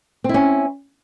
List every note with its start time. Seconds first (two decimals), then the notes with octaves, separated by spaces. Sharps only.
0.24 C4
0.29 E4
0.34 C#4